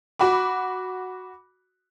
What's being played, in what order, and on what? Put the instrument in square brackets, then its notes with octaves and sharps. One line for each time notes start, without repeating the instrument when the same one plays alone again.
[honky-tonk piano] F#4 B5 D6